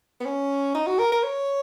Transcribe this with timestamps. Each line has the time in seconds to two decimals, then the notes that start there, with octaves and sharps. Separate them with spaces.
0.20 B3
0.25 C#4
0.74 D#4
0.87 F#4
0.99 A#4
1.12 A#4
1.23 C#5